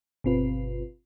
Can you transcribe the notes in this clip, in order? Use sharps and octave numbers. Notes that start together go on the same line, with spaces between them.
G1 B2 C4 F4 B4